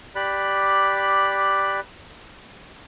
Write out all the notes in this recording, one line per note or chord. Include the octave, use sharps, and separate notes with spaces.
G4 D5 B5 F#6